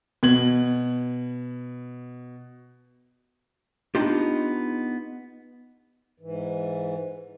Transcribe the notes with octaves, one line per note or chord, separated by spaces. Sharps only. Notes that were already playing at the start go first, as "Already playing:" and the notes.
B2 G#6 F#7
B3 D4 D#4 F4 G4
G#2 E3